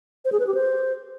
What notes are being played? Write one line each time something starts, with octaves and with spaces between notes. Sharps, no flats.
C5
G#4
B4
G4
C5